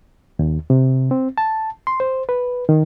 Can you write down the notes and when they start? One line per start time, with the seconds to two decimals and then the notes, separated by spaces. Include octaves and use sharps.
0.39 D#2
0.70 C3
1.11 C4
1.38 A5
1.87 C6
2.00 C5
2.29 B4
2.69 D#3